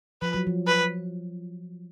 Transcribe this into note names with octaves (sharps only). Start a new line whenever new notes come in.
F3 B4
F#3
F3
B4